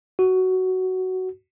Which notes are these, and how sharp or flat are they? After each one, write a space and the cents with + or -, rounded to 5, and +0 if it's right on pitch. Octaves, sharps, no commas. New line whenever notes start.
F#4 +10